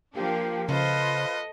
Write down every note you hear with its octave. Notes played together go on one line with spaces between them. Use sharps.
F3 A#3 D4 G4 F5
C#3 F4 A4 B4 C5 D#5